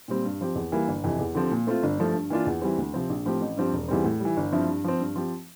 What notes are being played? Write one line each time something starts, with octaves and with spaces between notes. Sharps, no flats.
A#2 G3 C4
G2
F3 C4 G4
E2
E3 G3 A#3 E4
G1
F2 C3 E3
E2
D3 F3 C4 G4
A#2
A3 C4 F4
G1
G2 F3 A3
G2
E3 A#3 D4 F4
E2
E3 G3 C4
D2
C3 F3 C4
A#1
A2 F3 C4 G4
A1
G2 F3 C4 G4
E1
E2 E3 G3 C4
A2
E3 G3
G1
G2 F3 C4 E4
G2
F3 C4
G2
F3 C4 G4